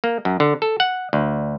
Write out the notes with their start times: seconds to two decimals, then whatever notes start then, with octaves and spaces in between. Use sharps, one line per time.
0.04 A#3
0.25 F#2
0.40 D3
0.62 A4
0.80 F#5
1.13 D2